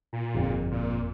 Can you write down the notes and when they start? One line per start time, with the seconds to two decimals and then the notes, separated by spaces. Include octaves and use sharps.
0.13 A#2
0.35 G1 F2
0.71 A#2